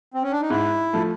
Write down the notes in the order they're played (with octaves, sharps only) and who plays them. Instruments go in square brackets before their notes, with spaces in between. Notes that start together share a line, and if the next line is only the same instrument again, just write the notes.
[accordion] C4
C#4
D4
D#4
[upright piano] G#2 [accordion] E4
[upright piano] F3 A3